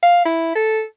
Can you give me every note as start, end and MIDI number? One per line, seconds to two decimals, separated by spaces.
0.03 0.24 77
0.26 0.54 64
0.55 0.82 69